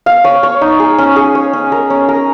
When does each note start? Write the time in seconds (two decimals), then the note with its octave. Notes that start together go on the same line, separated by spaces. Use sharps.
0.06 F5
0.24 C#5
0.43 C#5
0.61 D#4
0.80 G#4
0.98 C#4
1.16 G#4
1.35 C#5
1.53 C#4
1.72 A#4
1.90 C#4
2.09 A#4